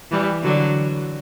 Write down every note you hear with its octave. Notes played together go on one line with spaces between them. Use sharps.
E3 G3
D3 F#3